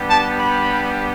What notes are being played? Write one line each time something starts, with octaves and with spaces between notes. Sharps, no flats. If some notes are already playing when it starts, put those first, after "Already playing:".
Already playing: G3 B3 D4 G4
A5
B5